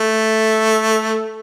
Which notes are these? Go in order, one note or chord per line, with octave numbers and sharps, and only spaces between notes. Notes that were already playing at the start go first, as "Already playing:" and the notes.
Already playing: A3